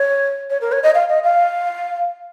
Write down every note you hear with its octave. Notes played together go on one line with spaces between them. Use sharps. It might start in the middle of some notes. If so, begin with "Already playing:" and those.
Already playing: C#5
C#5
A#4
C#5
D#5
F5
D#5
F5